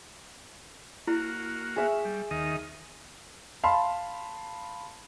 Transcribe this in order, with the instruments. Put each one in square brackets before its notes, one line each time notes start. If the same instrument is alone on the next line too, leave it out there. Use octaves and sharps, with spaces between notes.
[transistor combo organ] A#3 F#4 [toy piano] E4
[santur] G#4 E5 C#6
[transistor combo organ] G3
D#2 D#3 D#5
[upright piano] F5 A5 B5 C6